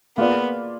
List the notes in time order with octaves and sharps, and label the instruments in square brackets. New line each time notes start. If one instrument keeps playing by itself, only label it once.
[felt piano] A#3 F4 G#4 D5 [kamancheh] B3